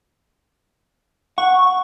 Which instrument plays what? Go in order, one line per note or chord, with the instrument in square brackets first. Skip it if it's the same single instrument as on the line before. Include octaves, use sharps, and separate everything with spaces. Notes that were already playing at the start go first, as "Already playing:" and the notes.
[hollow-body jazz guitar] F#5 [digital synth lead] C#6